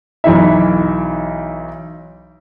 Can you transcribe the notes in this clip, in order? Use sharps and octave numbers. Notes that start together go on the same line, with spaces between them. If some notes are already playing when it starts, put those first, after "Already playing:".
B1 E3 D#4 E5